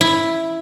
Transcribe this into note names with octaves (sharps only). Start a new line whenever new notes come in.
E4